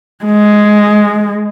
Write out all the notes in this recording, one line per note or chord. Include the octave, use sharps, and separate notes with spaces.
G#3